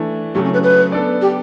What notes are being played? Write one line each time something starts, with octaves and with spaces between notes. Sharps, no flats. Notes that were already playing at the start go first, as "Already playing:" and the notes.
Already playing: E3 A3 D4
C#3 F#3 A3 G4
C#4
B4
B4
B3 D4 A4 D5
G4